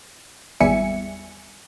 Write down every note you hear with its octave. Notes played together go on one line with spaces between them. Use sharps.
G#1 E2 G3 E5 G#5 C#7